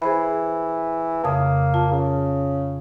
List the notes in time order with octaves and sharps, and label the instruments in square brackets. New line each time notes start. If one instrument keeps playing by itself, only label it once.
[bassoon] E3 [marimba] G#4 C5 B5
[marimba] F2 C#3 D#6 [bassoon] A#3
[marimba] F4 A5
[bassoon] C#3